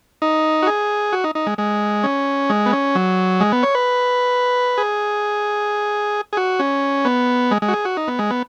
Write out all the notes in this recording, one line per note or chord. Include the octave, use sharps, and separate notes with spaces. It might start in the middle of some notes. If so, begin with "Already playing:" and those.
D#4
F#4
G#4
F#4
D#4
D#4
G#3
G#3
C#4
G#3
B3
C#4
F#3
G#3
B3
C#5
B4
G#4
G#4
F#4
C#4
B3
G#3
G#3
F#4
G#4
F#4
D#4
B3
G#3
B3